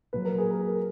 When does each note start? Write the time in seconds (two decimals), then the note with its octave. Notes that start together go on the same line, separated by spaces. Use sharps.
0.13 A#2 F#3 B4
0.25 A#4
0.38 G#4
0.51 A#4
0.67 A#4